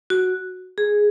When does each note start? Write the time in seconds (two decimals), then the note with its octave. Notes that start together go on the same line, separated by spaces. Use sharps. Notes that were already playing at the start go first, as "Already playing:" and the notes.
0.10 F#4
0.78 G#4